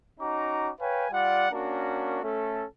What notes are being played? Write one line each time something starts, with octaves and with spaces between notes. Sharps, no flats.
C#4 D#4 F#4 A#5 D6
B4 C#5 F5 G5 G#5
G3 F4 D5 F#5
A#3 C#4 D4 F#4 A#4
A3 C#4 A4